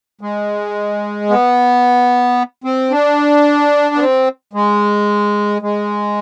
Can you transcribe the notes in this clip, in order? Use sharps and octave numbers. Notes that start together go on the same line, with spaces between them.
G#3
B3
C4
D4
B3
C4
G#3
G#3